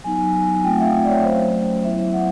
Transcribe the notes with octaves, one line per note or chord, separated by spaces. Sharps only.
F#3 B3 D#4 G#5
A3 C4 F4 G5
F#5
E5
F5
E5
D5
C#5
F#3 A3 C#4 C5
F#3 B3 E4 E5
F#5